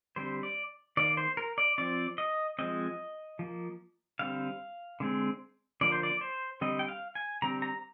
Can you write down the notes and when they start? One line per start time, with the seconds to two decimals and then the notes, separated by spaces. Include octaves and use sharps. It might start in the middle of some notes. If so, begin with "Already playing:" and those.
0.16 D3 G3 C4 C5
0.43 D5
0.97 D#3 A#3 D5
1.17 C5
1.37 A#4
1.58 D5
1.78 F3 C4 D5
2.18 D#5
2.59 F3 G#3 C4 D#5
3.39 F3 A#3
4.19 D3 G3 C4 F5
5.00 D3 G#3 C4
5.81 D3 F3 A#3 D5
5.92 C5
6.03 D5
6.21 C5
6.61 D3 G3 C4 D#5
6.79 G5
6.89 F5
7.15 G#5
7.42 D3 G3 C4 A#5
7.62 A#5